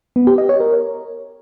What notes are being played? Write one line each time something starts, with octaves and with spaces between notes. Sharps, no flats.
B3
G4
D#5
C#5
A#4